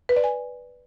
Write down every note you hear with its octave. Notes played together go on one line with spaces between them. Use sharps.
B4
D5
G#5